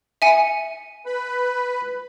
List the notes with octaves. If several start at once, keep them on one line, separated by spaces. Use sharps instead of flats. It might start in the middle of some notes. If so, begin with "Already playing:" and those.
E5 G#5 C#7
B4 B5